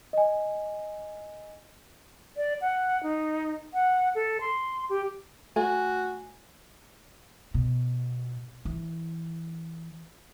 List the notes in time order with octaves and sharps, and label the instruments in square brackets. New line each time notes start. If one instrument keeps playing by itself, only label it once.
[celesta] D#5 G#5
[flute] D5
F#5
D#4
F#5
A4
C6
G4
[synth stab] A3 [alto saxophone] F#4 [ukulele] G#5
[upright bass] B2
E3